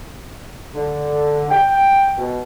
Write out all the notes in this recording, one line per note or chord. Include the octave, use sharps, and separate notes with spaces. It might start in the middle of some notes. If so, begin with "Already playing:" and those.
D3
G5
B2